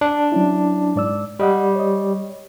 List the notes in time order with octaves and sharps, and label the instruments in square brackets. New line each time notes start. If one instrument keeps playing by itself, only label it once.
[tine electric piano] D4
[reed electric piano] F#3 C#4 E4
G#2 D5 E6
[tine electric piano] G3 [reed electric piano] G4 D#5 F#5
[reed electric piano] C#5 D#5